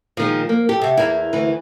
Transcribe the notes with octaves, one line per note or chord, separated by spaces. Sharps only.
A#2 D#3 F3 G#3
A#3
G4 A4
C3 F#4
E2 A#3 E4
D2 E3